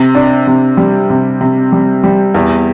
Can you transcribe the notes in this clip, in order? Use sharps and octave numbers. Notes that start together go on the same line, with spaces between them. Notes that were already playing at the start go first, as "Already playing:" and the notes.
Already playing: C3
D4
C3
G3
C3
C3
G3
G3
E2